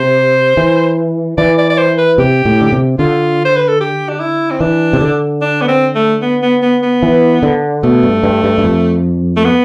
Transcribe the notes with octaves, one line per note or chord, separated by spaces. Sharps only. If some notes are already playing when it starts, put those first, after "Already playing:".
Already playing: C3 C5
E3
E3 D5
D5
D5
C5
B4
C3 G4
A2
D3
C3
D3 F4
C5
B4
A4
G4
D4
E4
C4
E3 D4
C3
D3
D4
B3
C4
A3
B3
B3
B3
B3
E3
D3
B2 A3
G2
G2
G2
G2
F2
A3
B3